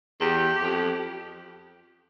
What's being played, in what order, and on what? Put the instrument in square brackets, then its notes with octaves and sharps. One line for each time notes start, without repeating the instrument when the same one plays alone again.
[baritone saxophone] E2 [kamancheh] G4
[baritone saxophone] F2